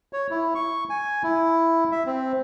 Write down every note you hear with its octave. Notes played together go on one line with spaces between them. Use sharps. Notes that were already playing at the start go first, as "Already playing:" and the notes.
C#5
E4
C#6
G#5
E4
E5
C4